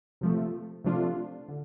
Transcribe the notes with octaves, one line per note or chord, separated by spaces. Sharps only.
C3 F3 A3
C3 F3 A3 D4 F4
D3